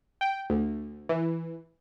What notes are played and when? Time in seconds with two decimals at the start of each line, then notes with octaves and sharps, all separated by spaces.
0.21 G5
0.50 D2
1.09 E3